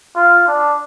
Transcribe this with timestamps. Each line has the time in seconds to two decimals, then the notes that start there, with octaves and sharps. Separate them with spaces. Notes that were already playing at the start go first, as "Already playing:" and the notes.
0.16 F4
0.48 D4